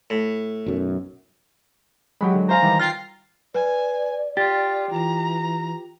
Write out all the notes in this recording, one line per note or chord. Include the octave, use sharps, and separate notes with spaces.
A2
B1 F#2
F#3 G#3 G4 F#5 B5
D3
C5 F5 G#5 A#5
D#3 E3 G3
F4 G5 F6 A#6 C7
B4 D5 G#5
F4 G4 A6
E3 F4 A#5